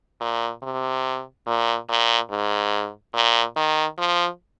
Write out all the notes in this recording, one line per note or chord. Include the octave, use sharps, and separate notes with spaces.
A#2
C3
A#2
A#2
G#2
A#2
D#3
F3